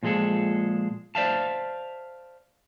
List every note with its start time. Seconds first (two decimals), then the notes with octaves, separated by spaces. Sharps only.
0.03 A#2 F3 G#3 G#4 A4
1.15 C5 D5 E5 F5 A5